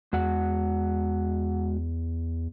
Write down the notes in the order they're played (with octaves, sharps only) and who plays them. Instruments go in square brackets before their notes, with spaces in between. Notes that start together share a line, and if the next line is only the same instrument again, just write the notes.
[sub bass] E2 [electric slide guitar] G#3 F#4 F#5